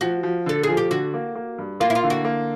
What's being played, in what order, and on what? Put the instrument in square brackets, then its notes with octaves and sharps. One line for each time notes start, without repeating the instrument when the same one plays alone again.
[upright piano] F3 [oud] F#4
[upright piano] F3
[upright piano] D3 [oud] A4
[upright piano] F3 [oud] G#4
[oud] G4
[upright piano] D3 [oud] F#4
[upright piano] A#3
A#3
G2
[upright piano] A#3 [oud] F4
[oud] E4
F4
[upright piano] D3
[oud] F#4
[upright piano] A#3